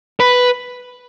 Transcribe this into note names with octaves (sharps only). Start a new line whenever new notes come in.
B4